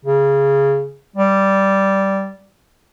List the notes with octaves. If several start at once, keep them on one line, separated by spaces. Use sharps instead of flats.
C#3
G3